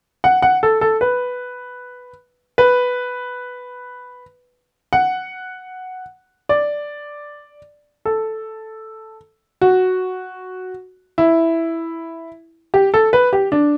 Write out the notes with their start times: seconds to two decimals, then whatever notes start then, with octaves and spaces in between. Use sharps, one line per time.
0.24 F#5
0.42 F#5
0.63 A4
0.81 A4
1.01 B4
2.58 B4
4.93 F#5
6.49 D5
8.05 A4
9.62 F#4
11.18 E4
12.74 G4
12.94 A4
13.13 B4
13.33 G4
13.52 D4